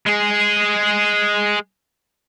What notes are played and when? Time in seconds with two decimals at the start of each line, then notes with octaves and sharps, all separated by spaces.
0.06 G#3 G#4